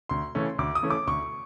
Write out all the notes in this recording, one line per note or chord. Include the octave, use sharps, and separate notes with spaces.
D2 C6
C#3 E3 A3 C#4
D2 D6
D#6
C#3 E3 A3 C#4
D6
D2 C#6